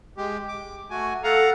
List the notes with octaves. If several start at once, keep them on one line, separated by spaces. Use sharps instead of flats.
G#3 G4
D6
A3 F#4 G#5
A4 F5 F#5 A#5